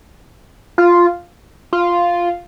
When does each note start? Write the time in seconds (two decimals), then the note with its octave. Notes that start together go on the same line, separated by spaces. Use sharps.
0.78 F4
1.73 F4